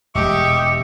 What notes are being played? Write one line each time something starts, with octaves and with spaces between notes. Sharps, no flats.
E1 G#3 G4 D#5 E5 C#6 D6